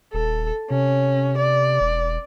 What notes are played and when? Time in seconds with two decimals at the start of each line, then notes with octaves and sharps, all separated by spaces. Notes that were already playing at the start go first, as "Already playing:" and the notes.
0.13 D#1 A4
0.70 C3 C#4
1.38 D5
1.80 E1